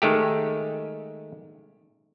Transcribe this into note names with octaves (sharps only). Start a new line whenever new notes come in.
D#3 G#3 A3 G4